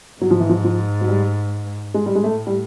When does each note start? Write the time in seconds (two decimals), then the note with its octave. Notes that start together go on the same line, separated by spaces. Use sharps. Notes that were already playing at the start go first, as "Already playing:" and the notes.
0.21 G#2 F#3
0.31 F3
0.40 E3
0.49 F3
0.64 F3
1.01 F#3
1.08 G3
1.94 A2 G#3
2.06 G3
2.15 G#3
2.24 A3
2.47 G3